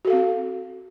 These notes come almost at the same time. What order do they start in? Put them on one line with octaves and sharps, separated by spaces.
F#4 A4 F5 C4